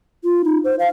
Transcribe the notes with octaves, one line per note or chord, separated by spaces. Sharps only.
F4
D#4
C5
F5